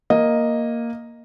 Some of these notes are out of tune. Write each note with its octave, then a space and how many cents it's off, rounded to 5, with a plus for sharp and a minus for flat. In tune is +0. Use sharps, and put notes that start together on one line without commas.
A#3 +0 D#5 +0